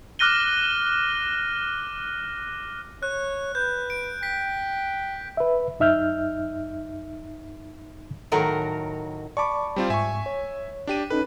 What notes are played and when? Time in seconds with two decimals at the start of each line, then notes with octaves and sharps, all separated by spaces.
0.19 D6 F6 F#6 A#6 D#7 G7
3.03 C#5 F#6
3.55 B4 G6
3.90 D7
4.23 G5 B6
5.37 B4 E5
5.80 F#2 D#4 E5 F6 G6
8.32 A2 D#3 F#3 F#4 A#4
9.37 D5 A5 B5 C#6 D6
9.76 G3 C4 F4
9.90 G#2 E5 G#5 C#6
10.26 C#5
10.87 D4 G4 D#7
11.10 C#4 D#4 A4 B4